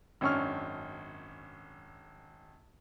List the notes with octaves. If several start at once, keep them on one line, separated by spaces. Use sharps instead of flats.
G#1 F#2 C#4 D4 C#6 F6